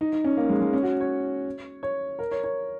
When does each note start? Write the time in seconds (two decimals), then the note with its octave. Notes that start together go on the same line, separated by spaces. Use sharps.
0.01 D#4
0.13 D#4
0.24 C#4
0.37 A#3
0.49 G#3
0.60 G#3
0.73 C#4
0.83 F#4
1.00 C#5
1.83 C#5
2.19 A#4
2.31 C#5
2.44 C#5